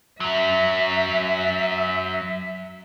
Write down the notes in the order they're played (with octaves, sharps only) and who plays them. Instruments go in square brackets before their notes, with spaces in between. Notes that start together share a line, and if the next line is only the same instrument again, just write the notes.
[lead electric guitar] F#2 F#3 [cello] E5